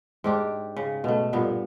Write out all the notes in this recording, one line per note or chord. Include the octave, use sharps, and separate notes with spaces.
G#2 D4 G4
C#3
B2 A3
G2 A#2 B3